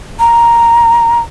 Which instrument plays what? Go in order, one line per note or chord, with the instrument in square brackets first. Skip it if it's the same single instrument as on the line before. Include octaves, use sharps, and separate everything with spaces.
[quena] A#5